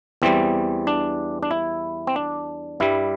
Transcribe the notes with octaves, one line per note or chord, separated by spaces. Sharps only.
E2 E3 G3 C4
D4
D4
E4
C4
D4
G2 G3 E4